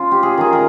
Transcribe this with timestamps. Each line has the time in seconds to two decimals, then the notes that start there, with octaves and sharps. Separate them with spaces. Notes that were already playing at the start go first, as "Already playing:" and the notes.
Already playing: C#4 F4
0.11 G4
0.23 G#4
0.38 D#3 G#4
0.53 A#4